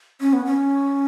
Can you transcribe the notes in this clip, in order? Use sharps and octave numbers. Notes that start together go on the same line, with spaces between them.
C#4
B3
C#4